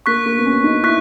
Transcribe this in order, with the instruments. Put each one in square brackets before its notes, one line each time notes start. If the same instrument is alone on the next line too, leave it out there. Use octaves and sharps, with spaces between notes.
[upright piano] A#3 [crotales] C#6 F#6 B6
[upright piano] A#3
B3
C#4
D#4
[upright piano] E4 [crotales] C#6 F#6 B6